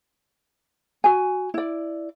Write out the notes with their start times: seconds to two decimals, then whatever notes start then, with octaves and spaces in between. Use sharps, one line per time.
1.04 F#4 G#5
1.54 E4 D5